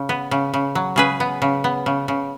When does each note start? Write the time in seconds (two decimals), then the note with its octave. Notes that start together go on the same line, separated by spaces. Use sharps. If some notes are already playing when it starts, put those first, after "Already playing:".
Already playing: C#3
0.09 B3
0.31 C#3
0.54 C#3
0.75 F#3
0.96 C#3 G#4 B4
1.20 B3
1.42 C#3
1.64 B3
1.86 C#3
2.08 C#3